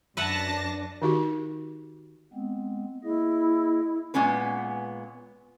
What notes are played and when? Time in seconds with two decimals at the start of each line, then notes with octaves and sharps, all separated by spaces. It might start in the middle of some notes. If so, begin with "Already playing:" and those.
0.17 F#2 D4 B4 E5 F#5 A5 A#6
1.02 D#3 D#4 F#4 G4
2.33 G#3 B3 C4
3.04 A#3 E4 G#4 D#5
4.14 A#2 G#3 B3 C#4 B4